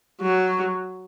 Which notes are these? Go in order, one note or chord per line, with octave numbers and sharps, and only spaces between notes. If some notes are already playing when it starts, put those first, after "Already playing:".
F#3